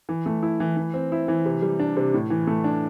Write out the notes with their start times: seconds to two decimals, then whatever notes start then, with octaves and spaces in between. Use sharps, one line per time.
0.09 E3
0.26 A3
0.43 E4
0.60 E3
0.77 E3
0.94 C4
1.12 E4
1.28 E3
1.45 C3
1.62 G3
1.80 D4
1.97 C3
2.14 A2
2.30 E3
2.47 A3
2.64 D4